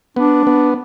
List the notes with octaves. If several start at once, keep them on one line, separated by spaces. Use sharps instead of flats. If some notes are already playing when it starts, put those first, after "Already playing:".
B3 D4
B3